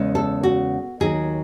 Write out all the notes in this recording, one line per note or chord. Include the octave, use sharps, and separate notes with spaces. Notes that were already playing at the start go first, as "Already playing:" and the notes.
Already playing: E2 C#3 G#3
A4
F#4
D#2 D#3 F#3 G#4